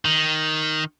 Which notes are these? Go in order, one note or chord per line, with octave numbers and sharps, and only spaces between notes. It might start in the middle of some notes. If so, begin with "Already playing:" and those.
D#3